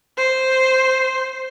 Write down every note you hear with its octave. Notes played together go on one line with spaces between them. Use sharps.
C5